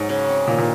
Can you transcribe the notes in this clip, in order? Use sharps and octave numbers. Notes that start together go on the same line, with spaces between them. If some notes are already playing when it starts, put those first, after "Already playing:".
Already playing: G#2 F#3
C#3
C4
A#2 D#3
A#2